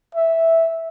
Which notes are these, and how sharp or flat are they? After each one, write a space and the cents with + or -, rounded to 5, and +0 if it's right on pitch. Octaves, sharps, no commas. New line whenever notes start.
E5 -5